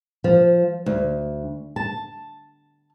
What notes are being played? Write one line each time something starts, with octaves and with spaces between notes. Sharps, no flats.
F3
D2
A5